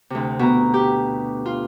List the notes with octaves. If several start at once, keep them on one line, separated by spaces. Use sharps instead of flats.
D2 C3
B2 A#5
G4
F4